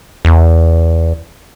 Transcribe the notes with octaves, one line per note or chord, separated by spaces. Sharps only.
E2